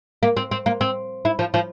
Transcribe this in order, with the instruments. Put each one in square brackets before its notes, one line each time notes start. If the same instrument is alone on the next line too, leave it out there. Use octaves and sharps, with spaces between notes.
[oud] A#3
C4
C4
A#3
C4
E4
F3
F3